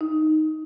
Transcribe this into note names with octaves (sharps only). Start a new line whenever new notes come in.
D#4